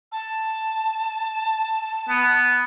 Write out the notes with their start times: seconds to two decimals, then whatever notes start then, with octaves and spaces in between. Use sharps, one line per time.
0.12 A5
2.09 B3